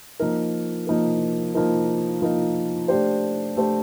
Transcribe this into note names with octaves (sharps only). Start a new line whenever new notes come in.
F3 A#3 D#4 A#4
F3 A#3 D#4 A#4
F3 A#3 D#4 A#4
F3 A#3 D#4 A#4
A3 D4 G4 C5
A3 D4 G4 C5